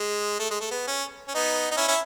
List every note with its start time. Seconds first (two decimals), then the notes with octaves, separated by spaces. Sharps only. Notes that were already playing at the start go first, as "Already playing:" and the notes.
Already playing: G#3
0.39 A3
0.50 G#3
0.61 A3
0.71 B3
0.87 C#4
1.28 C#4
1.34 B3 D#4
1.71 D#4
1.77 C#4 E4
1.88 C#4 E4